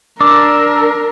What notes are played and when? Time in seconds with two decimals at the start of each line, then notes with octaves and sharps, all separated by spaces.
0.21 D4 A#4 D6 E6